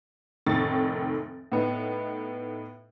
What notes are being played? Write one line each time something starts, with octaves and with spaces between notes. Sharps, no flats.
F1 A2 D#3 C#6 A6
A2 B3 D#4